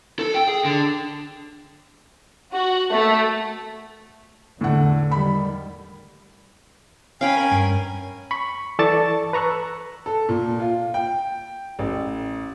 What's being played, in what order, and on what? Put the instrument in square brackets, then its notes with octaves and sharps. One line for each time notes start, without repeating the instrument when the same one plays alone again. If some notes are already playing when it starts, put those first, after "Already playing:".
[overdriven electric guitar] A4
G5
G#4
D3
[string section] F#4
A3
[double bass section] E2 D3 [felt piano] A2 F#5
[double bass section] D#3 G3 [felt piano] B5
[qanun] C#4 G5 B5 [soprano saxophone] F5 [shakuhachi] G#5
[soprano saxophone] A#4
[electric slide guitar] G2
[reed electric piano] B5 C#6
E3 A4 D5 A5 C#6 A6
B4 A#5 C#6 E6 F#6
[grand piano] A4
A#2
F4
G5
A1